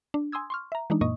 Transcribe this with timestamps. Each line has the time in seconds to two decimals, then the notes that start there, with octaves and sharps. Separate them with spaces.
0.14 D4
0.32 G#5 C6 D#6 E6 G#6
0.50 C6 C#6 F6
0.72 E5 A#5
0.90 E3 G#3 D4 D#4
1.01 F#2 A#2 A#3 D#5 C#6 D#6